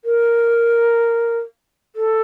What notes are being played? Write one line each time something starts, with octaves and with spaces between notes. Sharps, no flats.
A#4
A4